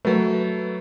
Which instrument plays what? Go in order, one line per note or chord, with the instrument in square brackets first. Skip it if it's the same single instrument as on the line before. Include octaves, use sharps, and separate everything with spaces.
[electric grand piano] F#3 A3 [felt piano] B4